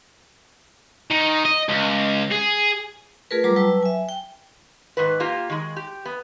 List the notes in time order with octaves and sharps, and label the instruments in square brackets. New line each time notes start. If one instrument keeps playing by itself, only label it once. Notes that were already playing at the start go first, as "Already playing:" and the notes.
[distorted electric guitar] D#3
D#5
C#2
G#4
[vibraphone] A3 F4 G#4 A#4 B4
F#3 G3 F4 A#5 D6
F#3 B4 G5 A5 E6
E5 G#5
G5
[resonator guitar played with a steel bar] G#2 D#3 B4
A#3 F4 G4
D#3 G#3
G4
B3